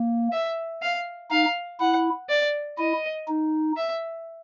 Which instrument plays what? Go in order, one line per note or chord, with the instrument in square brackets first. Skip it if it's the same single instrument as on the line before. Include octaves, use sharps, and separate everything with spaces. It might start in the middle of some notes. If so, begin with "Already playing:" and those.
Already playing: [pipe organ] A#3
[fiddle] E5
F5
[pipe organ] D#4 [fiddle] F5
[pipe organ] E4 [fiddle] F#5
[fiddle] D5
[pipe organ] E4 [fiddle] D#5
[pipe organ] D#4
[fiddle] E5